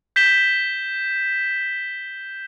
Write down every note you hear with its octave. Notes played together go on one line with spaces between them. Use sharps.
G6 B6 E7 G7